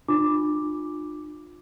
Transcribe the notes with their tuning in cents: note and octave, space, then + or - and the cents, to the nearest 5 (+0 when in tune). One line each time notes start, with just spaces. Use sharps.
D4 +45 F4 +25 D6 +0